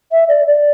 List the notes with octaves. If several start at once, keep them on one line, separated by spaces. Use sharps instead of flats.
E5
D5
D5